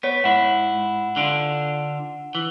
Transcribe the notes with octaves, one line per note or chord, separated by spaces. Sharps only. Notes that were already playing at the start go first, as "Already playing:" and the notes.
B3 C#5 B6
G#2 E4 F#5
D3 D4 F4
E3